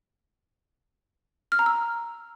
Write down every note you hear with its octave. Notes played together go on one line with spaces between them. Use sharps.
F6
A#5
E6